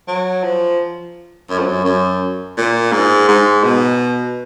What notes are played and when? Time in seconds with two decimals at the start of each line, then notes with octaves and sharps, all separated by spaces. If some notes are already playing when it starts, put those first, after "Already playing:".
0.07 F#3
0.44 F3
1.50 F#2
1.59 F2
1.66 F#2
1.85 F#2
2.57 A#2
2.92 G#2
3.29 G#2
3.64 B2